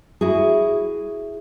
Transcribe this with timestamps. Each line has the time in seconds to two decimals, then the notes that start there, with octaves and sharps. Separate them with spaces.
0.21 E4 F#4 G#4